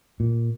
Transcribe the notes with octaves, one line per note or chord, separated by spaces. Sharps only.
A#2